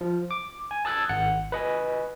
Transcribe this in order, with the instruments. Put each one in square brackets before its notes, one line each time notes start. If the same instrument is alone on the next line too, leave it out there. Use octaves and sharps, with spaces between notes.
[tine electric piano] F3
D6
G#5
A5 D#6 E6 F#6 G#6 A6
G#1 F#5 C#7
B4 D#5 G#5